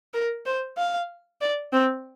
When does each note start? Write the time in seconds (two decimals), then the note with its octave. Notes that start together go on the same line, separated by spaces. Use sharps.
0.14 A#4
0.46 C5
0.77 F5
1.41 D5
1.73 C4